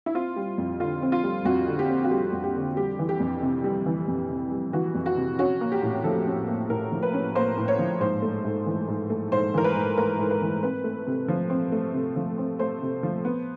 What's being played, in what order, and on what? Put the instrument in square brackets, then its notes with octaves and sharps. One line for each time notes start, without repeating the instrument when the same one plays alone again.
[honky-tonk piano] E4
C4 F4
G3
F2
D3 F4
C4
F4
G3
F2 F#4
D3
G4
C4
F#4
G3 G4
F2
G4
D3
G3 G4
E3
G4
F2
C3
G3
E3
F2
C3
G3
E3 F#4
F2
F#4
C3
C#4 F#4
A#3
G4
A2
F3 A4
C#4
A#3
A2 A#4
F3
B4
C#4
A#3 C5
A2
C#5
F3
G#2 C5
A3
G#2
E3
G#2
A3
G#2 C5
E3 A#4
B4
G#2
A3 A#4
G#2
B4
E3
C4 B4
A3
C3
F3
C4
A3
C3
F3
C4
A3 C5
C3
F3
B3